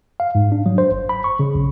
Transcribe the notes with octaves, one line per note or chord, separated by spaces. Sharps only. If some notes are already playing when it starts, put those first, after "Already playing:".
F5
G#2
D4
F#3
C5
G1
B5
C#6
C#3
B1